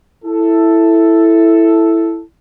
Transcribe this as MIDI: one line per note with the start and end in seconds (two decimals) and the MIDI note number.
0.24 2.22 64
0.24 2.22 69